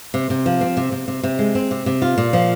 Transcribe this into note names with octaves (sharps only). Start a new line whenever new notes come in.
C3
C3
F3
C4
C3
C3
C3
C3
G#3
C4
C3
C3
F4
A#2
F3